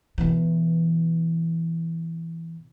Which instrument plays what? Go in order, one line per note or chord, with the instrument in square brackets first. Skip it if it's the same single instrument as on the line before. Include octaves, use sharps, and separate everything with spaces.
[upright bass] B2 E3